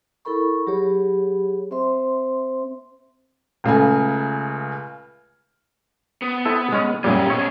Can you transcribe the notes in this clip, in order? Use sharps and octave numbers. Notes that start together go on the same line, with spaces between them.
E4 A4 A#4 B5 C#6
F#3 G4 G#4 C#5 B5
C4 C5 E5 C6
C#2 C#3 A3 G#5
B3
C4 E4 A4
G#3 C#4
F#2 A#2 G3 C#4 G4
B2 C#4 C#5